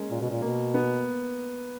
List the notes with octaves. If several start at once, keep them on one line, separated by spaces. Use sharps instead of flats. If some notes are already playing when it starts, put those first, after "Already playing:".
Already playing: G#3 A#3 C#4
A#2
B2
A#2
B2 A#3
B3